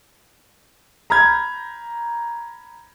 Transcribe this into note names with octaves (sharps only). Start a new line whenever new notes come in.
A#5 B5 F6 G6 G#6